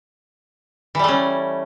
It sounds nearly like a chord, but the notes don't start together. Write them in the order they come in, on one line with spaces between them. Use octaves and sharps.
E3 G3 A3 C#4